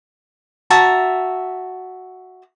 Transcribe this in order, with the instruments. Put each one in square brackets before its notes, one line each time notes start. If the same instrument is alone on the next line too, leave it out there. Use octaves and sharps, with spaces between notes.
[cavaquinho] F#4 E5 A5 A#5